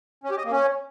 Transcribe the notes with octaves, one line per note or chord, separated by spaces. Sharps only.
C#4
G4
D#5
A#3
C#4